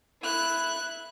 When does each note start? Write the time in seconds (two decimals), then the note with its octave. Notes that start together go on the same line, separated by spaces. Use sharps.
0.22 E4 F#6